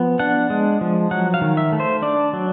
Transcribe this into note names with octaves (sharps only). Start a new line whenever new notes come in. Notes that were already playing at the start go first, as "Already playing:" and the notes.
Already playing: F3 B3
D4 F#5
G#3
F3
F#3 F#5
F5
D#3
E5
A3
C5
D4 D5
F#3